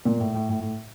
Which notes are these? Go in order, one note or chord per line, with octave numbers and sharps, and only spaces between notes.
A#2
A2
A2
A2
A2